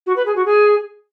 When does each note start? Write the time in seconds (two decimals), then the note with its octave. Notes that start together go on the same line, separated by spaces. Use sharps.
0.06 F#4
0.16 B4
0.26 G#4
0.36 F#4
0.45 G#4